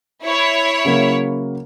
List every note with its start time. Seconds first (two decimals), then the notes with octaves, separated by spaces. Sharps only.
0.23 E4 C#5
0.85 C#3 F#3 A#3